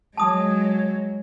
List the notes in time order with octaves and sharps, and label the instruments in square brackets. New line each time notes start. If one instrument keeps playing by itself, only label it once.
[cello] F#3 G#3 [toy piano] A5 D#6